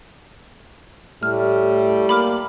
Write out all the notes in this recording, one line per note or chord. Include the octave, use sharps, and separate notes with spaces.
A2 G3 A3 F6
A#3 B5 D6 F6